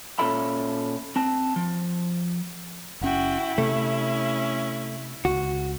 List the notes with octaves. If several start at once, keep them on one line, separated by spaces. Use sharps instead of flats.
A#2 C#4 F4 A4 E5 B5
C4 A5
F3
F#1 C#4 E4 F#4 G5
C3 A3 C#4
C#2 F#4